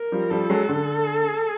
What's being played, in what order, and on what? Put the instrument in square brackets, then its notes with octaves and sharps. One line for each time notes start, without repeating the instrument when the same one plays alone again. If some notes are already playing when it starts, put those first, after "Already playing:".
Already playing: [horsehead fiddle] A#4
[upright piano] F3 G3
[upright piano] F3 G3 [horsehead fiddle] A4
[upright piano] F#3 G#3
D3